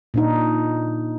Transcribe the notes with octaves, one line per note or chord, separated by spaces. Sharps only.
A#2 D4 D#4